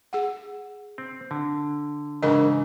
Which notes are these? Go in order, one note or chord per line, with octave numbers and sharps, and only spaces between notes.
G#4 F#5
C4
D3
G#2 C#3 E3 D4 A#4 D#5